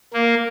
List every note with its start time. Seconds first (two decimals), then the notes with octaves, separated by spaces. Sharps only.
0.14 A#3